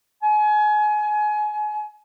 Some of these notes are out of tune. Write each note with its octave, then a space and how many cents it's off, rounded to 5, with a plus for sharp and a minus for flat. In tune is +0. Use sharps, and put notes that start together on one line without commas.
G#5 +30